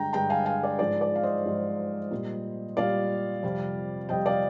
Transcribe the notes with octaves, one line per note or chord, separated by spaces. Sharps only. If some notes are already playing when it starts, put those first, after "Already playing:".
Already playing: G2 D3 G#3 G5 A#5
G2 D3 G#3 G5 A#5
F5 G#5
F5 G#5
D5
G#2 F3 G#3 D5
D5
F5
C5 D#5
G#2 F3 G#3
A#2 G3
A#2 G3 D5 F5
F2 C3 G3
F2 C3 G3 D#5 G5
D5 F5